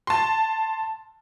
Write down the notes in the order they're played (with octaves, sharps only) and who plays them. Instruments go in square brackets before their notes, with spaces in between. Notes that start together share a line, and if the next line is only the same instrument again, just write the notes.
[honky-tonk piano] A5 C6